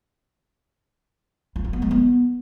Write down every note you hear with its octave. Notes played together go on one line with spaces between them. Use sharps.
F4
C4
B3
G#3
B3